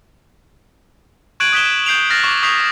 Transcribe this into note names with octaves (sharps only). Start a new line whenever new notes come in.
C#6 F#6 G#6 D7 D#7 F#7
D#6 F#6 B6 E7 G7
G6 C7 D7 F7 F#7
F6 A6 A#6 C7
C#6 D6
C#6 D#6 G6 B6 C7 F7